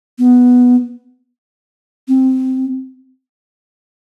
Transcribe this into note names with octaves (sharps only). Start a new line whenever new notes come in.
B3
C4